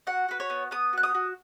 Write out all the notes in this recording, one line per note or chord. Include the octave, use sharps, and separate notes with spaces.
F#4 F#5
F#4 B4
C#5
B3
B3 D#6
F#4 F#6
D#6
F#4